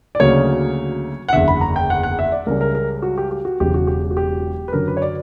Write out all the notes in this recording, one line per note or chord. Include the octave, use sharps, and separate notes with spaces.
D5
D2 C#3 F#3 A#3 C#5
F#5
F#1 E2 D3 E5
B5
A#5
G5
F#5
F#5
E5
D5
C#2 C#3 G3 C#4 A#4
A#4
A#4
F#4
G4
G4
F#4
E1 E2 C#3 F#3 G4
F#4
G4
F#4
G4
B4
F#2 D3 F#3 C#4 A#4
B4
C#5
D5